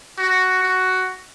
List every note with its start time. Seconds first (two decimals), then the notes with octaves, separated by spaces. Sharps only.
0.18 F#4
0.63 F#4